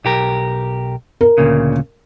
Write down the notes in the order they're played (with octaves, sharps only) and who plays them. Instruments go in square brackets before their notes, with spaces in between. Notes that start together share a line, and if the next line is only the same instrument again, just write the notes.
[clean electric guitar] B1 G4 A#4
[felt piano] A#4
[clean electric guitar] D2 A#2 C#3